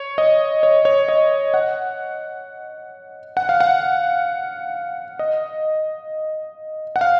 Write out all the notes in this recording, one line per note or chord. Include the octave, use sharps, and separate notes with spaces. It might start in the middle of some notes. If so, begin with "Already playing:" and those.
Already playing: C#5
D#5
C#5
C#5
D#5
F#5
F#5
F5
F#5
D#5
F#5
F5